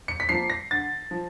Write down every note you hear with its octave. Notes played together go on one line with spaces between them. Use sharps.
C#7
B6
F3 A#3 C7
A#6
D3 A6
F3